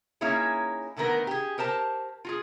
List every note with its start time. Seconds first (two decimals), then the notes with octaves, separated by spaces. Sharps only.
0.21 A#3 C#4 D#4 E4 G#4 C#5
0.96 A2 D3 D#3 B3 A#4
1.27 G4 G#4
1.58 G4 A#4 C5 A5
2.25 F4 F#4 G#4